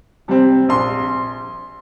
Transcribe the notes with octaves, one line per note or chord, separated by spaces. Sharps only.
C3 G3 C4
A#1 C6